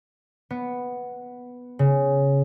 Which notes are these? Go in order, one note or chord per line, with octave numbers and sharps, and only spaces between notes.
B3
C#3